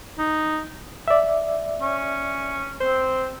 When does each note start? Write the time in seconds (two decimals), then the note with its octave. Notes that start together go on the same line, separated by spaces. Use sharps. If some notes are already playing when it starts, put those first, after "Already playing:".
0.18 D#4
1.08 D5 E5
1.82 C#4
2.81 C4 C5